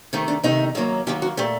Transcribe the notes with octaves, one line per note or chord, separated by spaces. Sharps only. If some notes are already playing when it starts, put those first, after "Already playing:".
C3 D#3 A3 C4
D4
C3 D#3 A3 D#4
F#2 D#3 F#3 A#3
F#2 D#3 F#3 A#3 G4
F#4
A#2 A3 G4